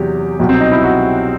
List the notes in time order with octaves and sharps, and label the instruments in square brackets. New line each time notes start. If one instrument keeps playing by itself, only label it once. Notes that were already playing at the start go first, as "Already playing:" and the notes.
Already playing: [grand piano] E2 C3 F#3 G4
C2 B2 F#3
C4
D#4
E4
F#4